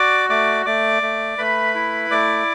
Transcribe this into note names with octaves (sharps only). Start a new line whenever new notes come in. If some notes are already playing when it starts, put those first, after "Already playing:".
Already playing: F#4 D5 D6
A3 D5 D6
A3 D5 D6
A3
A3 B4 B5
E4
A3 D5 D6